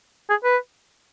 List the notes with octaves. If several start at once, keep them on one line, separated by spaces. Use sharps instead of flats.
G#4
B4